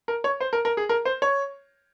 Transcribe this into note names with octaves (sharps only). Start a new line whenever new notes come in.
A#4
C#5
C5
A#4
A#4
G#4
A#4
C5
C#5